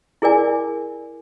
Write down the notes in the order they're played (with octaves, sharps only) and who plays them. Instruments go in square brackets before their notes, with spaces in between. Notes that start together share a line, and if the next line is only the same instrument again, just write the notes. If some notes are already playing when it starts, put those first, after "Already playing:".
[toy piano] E4 G#4 A#4 D5 G#5